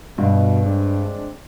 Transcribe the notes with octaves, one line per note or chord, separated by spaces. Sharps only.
G2 B2
G#3 C4 D4